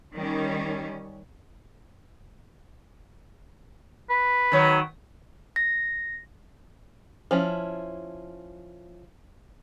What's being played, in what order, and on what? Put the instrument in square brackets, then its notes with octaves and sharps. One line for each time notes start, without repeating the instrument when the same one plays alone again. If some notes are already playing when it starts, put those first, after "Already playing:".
[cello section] D#3 G3 C#4
[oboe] B4
[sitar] D#3 F#3
[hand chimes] A#6
[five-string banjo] F3 C#4 E4